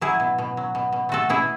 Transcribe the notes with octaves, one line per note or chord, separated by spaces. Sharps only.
F#3 E4 G#4
B2
B2
F#3
B2
B2
A3 F#4 A4
B2 E4 G#4